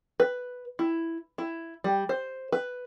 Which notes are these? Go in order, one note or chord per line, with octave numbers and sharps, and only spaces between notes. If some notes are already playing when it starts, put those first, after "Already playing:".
B4
E4
E4
G3
C5
B4